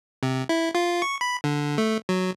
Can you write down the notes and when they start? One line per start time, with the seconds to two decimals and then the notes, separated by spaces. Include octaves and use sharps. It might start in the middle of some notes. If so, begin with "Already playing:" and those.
0.23 C3
0.49 E4
0.75 F4
1.02 C#6
1.21 B5
1.44 D3
1.78 A3
2.09 F#3